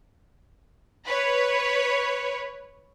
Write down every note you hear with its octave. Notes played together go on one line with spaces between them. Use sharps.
B4 C#5